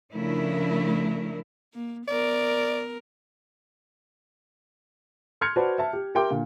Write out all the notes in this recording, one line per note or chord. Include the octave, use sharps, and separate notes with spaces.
C#3 F3 A3 D4 E4 A#4
A#3
B3 A#4 D5
C6 F6 G6 G#6 C#7
F#4 B4 C5 D5 A5
E5 A5
G4
G4 A#4 E5 G5 C6 D6
A#2 D3